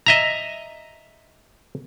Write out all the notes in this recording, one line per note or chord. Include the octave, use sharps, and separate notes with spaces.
D#5 E5 A#5